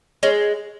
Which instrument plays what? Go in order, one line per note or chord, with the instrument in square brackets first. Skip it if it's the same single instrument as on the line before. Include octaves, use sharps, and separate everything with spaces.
[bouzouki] G#3 C#4